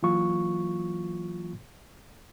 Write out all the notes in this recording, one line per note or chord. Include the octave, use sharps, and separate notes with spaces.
E3 F#3 A#3 F4 C#6